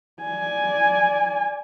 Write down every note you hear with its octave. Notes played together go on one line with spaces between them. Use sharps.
D5 G#5